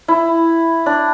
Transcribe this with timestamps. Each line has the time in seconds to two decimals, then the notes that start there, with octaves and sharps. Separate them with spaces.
0.08 E4
0.86 D4